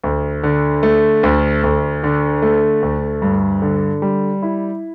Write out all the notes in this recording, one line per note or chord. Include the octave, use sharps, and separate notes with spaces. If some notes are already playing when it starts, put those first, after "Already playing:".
D2
D3
A3
D2
D2
D3
A3
D2
G2
D3
G3
E4